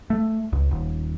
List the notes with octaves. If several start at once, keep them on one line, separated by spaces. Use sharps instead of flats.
A3
C#2
D#1